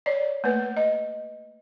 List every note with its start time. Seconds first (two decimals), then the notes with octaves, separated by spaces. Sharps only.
0.06 C#5 D5
0.44 A3 A#3 B4
0.77 D#5